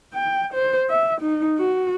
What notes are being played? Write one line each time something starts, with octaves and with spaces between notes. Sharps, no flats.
G5
C5
E5
D#4
F#4